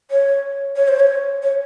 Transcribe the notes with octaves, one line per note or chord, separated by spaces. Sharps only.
C#5
C#5
C5
C#5
C#5